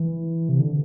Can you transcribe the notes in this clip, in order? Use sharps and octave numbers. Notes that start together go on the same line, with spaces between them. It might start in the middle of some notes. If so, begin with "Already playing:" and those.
Already playing: E3
C3
D3